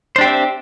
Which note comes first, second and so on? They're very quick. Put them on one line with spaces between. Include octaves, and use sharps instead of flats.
C5 D4 G4 C4 E5